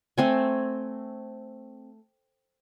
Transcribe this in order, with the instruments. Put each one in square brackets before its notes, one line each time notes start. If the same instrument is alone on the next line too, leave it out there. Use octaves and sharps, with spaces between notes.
[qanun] A3 C4 G#5